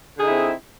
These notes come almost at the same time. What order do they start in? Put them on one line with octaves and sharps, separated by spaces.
D3 G#4 D#4 E4 C4